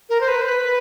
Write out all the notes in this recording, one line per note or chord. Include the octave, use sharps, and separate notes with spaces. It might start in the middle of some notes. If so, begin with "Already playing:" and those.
A#4
C5
B4
C5
B4